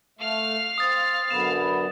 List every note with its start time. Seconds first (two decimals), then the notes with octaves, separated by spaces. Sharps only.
0.19 A3 F5 F6
0.78 C4 D#6 A6
1.30 F#2 D3 B3 E7